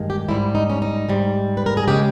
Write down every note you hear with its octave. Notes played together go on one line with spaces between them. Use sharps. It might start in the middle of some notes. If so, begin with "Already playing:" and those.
Already playing: G2 D#3 G#3
G4
G#2 G3 E4
D#4
C#4
D#4
G#2 G3
B4
A#4
G#4
C#3 G#3 G4